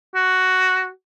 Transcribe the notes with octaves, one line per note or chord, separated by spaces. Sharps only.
F#4